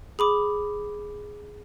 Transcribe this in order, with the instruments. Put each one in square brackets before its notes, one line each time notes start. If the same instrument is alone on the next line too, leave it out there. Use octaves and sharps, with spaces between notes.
[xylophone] G#4 B5 D6